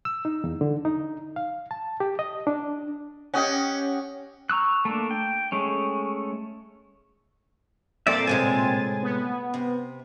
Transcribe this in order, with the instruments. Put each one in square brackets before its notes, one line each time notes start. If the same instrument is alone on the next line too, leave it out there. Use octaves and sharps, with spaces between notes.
[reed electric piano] E6
D#4
E2
D3
D#4
F5
A5
G4
D#5
D4
[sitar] C#4 [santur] G4 D#5 F#5
[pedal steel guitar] A#5 C#6 E6 F#6
A3 A#3 D4
G5
G#3 A3 C#4
[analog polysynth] A#2 C4 A6 [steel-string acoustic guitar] A4 [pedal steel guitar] D5 E5
[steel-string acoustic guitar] A2 C3 G#3 [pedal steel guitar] G#5
[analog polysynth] B3
[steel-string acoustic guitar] C3